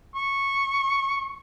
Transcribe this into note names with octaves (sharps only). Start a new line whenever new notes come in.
C#6